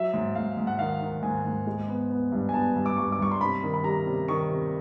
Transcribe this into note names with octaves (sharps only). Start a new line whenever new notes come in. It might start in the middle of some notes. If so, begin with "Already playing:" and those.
Already playing: F#3 E5
G#2
G#2 F5
G#2
F#5
D#3 F5
D#3
G#2 G#5
G#2
G#3
B3
B3
G2
G#5
B3 A5
G2
D6
G2 C#6
D6
G2 C#6
C6
C3 B5
D#3
B5
G3 A#5
C3
D#3 C#6
C3